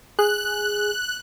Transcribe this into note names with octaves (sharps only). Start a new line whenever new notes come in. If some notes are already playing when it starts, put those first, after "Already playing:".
G#4 F#6